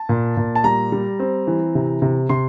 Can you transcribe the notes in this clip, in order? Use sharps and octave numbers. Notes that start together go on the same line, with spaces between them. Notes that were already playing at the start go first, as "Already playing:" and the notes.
Already playing: A5
A#2
A#2
A5
G3 A#5
G3
C4
E3
C3
C3
C3 C6